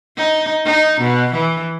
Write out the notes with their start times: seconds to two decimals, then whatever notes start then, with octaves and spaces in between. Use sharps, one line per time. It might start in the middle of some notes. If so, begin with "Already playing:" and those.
0.17 D#4
0.65 D#4
1.01 B2
1.33 E3